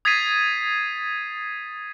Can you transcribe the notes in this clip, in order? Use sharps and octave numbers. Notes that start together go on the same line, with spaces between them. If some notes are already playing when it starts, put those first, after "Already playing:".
D#6 G#6 A6 B6 C7 D#7